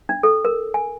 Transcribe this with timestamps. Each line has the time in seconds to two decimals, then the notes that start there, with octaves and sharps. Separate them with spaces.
0.09 D4
0.23 A4
0.45 A#4
0.74 G#5